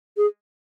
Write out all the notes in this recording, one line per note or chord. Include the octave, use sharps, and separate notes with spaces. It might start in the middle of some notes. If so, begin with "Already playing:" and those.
G#4